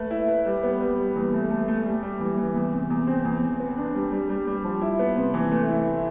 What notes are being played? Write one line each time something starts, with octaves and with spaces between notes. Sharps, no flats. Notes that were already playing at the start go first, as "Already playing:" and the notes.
Already playing: A3 B4
E4
B4
G3
B3
G3
G3
E2
A3
A3
A3
G3
G3
E3
E3
E2
C3
E2
C4
E2
E2
B3
D4
G3
G3
G3
G3
F3
E4
B3
C3
E3
A3
E4
E4